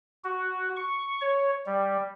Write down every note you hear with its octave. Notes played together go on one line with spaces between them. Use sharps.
F#4
C#6
C#5
G3